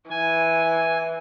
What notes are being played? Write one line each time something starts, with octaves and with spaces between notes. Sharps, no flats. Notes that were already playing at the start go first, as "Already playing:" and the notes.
E3 G#5